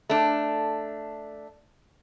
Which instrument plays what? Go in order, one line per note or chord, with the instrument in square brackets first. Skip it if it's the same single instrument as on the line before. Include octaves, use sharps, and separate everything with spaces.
[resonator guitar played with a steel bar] A3 D4